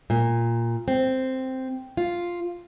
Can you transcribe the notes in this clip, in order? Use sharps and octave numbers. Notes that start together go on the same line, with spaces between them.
A#2
C4
F4